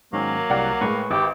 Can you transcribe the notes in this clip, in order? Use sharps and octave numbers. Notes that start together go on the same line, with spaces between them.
G#2 D#3 F#3 A#3 C#4
C2 G4 D5 F5 F#5 A#5
A2 G#3 B4 C#6
G#1 G4